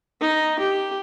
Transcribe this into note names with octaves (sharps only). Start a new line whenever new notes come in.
D#4
G4